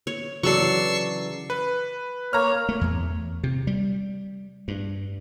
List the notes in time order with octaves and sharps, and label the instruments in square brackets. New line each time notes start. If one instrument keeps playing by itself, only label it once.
[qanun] C#5
[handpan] C#3 E3 D5 [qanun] F#3 A4 [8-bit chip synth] C#6 E6 C7
[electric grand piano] B4
[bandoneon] A#3 C#5 [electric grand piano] A#5 F6
[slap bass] A3
E2
C3
G3
G2